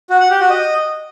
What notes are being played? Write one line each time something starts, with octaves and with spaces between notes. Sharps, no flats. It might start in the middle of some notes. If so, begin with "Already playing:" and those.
F#4
F#5
G4
F#4
D#5